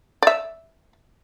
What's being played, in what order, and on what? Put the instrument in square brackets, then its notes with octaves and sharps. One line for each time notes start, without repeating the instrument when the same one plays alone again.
[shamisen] D5 E5